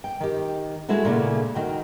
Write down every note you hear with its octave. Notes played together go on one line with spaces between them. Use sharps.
G5
D#3 G4
G#3 A3 E4 F#4 A4
A#2 C#3 A3 D4 E4
D#3 F#4 G5